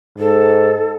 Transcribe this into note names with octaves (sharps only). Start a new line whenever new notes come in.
G#2 A4